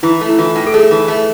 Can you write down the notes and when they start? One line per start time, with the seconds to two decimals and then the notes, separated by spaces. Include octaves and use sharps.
0.03 E3 E4
0.21 A3
0.29 E4
0.39 E3 F4
0.55 A2
0.67 A4
0.74 A3 G#4
0.91 E3
1.08 A3